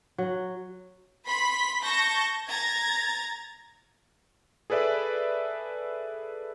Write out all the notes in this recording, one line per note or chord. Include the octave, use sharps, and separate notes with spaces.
F#3
B5 C6 B6
A5 C#6 G6 A#6
A#5 G#6 A6
G#4 A4 B4 D5 E5